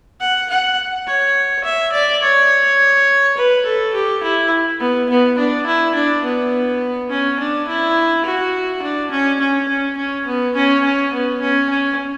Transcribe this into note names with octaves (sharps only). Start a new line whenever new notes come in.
F#5
F#5
C#5
E5
D5
C#5
B4
A4
G4
E4
B3
B3
D4
E4
D4
B3
C#4
D4
E4
F#4
D4
C#4
C#4
C#4
C#4
B3
C#4
C#4
B3
C#4
C#4